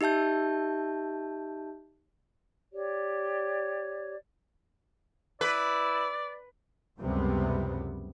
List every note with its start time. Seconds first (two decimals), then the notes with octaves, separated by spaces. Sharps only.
0.01 D#4 G4 E5 A5 G6
2.73 G4 C#5 D5
5.41 E4 B4 D5
7.01 C#2 F#2 C3 G3 B3